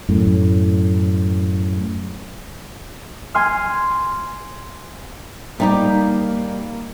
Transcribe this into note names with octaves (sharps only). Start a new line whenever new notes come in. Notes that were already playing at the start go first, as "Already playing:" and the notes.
F#2 A2
G#5 C6 F6
G3 A#3 D#4 G4